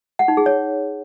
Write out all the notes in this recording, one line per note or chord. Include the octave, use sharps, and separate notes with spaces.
F#5
D#4
G#4
C#5